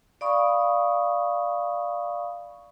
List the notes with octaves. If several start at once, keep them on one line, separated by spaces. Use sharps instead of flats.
D5 F5 B5 C#6 D#6